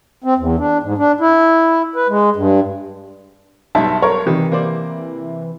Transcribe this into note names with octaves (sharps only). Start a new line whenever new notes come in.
C4
E2
D4
G#2
D4
E4
B4
G#3
G2
B1 G2 D#4 E5 A5
A#4 C#5
C3 D#3 E3 G3
A#3 C5 D5